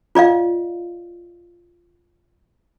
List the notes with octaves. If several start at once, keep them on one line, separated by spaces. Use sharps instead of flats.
F4 D5 D#5 F5